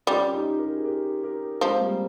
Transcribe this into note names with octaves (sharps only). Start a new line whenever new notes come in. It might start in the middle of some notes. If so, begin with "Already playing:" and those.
G3 C#4 F4
D#4 G4
G4 A#4
G#4
G4 A#4
G4 A#4
F3 G#3 C4
G3 A#3